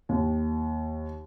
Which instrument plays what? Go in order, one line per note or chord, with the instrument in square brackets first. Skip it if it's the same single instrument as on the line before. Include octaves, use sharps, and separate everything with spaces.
[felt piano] D#2